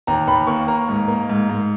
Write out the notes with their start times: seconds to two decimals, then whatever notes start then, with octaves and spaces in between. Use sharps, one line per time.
0.07 D#2 A#5
0.27 D#2 B5
0.47 A#3 C#6
0.68 A#3 A#5
0.89 G#2
1.08 A#3
1.29 G#2
1.50 G#2